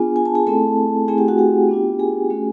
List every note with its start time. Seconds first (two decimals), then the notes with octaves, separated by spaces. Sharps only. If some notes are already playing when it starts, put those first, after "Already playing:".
Already playing: B3 D4 F4 G#4 G#5
0.16 G#5
0.26 A5
0.35 G#4 G#5
0.47 A3 C4 E4 A4 A5
1.08 A3 C4 E4 G#4 G#5
1.18 G4 G5
1.28 F#4 F#5
1.38 G4 G5
1.69 B3 D4 F4
1.99 G#4 G#5
2.30 A3 C#4 F#4